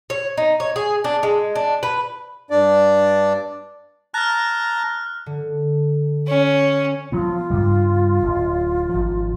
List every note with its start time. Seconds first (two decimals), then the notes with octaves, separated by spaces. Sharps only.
0.10 C#5
0.38 D#4
0.60 C#5
0.76 G#4
1.04 D4
1.23 G#3
1.56 D4
1.83 B4
2.50 G2 D4 D5
4.14 A5 A#5 F6 F#6
5.26 D3
6.28 C#4
7.12 F3 F#3 B3 F4
7.50 G2 C#3 G3
8.23 D1
8.89 G#1 F3